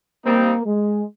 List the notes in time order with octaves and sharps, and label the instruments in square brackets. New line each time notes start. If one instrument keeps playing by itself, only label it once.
[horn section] G3 C4 D#4 [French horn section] A#3
[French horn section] G#3